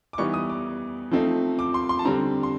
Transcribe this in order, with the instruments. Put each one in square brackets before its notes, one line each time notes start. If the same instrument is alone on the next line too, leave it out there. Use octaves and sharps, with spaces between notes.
[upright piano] D6
E3 G3 B3 D#4 C#6
D#6
D6
F3 A3 C4 D#4
D6
C6
C6
A5
D3 G3 C4 A#5
C6